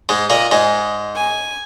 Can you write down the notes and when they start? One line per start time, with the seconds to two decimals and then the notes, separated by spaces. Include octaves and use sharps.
0.09 G#2 G#3
0.30 A#2 A#3 D#5
0.51 G#2 G#3
1.16 G#5